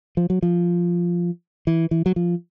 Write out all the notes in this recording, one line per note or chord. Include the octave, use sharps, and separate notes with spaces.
F3
F#3
F3
E3
E3
F#3
F3